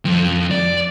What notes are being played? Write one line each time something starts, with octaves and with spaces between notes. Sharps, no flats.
F2
D5